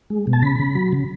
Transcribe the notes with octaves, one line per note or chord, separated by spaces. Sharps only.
G#3
B2
A5
C#3 B5
C#3
F#3
C#3